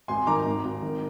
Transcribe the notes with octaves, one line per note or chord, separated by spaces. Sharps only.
G#1 G#5 C6
D#3 A#5 D6
G#1
G#1
D#3